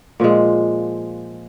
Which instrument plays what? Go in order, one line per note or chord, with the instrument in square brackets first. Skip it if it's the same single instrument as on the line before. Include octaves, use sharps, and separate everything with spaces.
[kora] A#2 F3 G#3